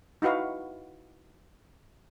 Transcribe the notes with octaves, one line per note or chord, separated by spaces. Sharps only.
D#4 E4 F#4 B4 F5